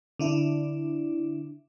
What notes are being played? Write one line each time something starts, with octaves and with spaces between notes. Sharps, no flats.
D3 D4 E4